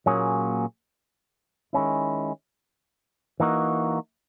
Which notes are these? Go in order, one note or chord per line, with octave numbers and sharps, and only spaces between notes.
A#2 F#3 A#3 C#4 G#4
D#3 G#3 C#4 E4
E3 A#3 D#4 F#4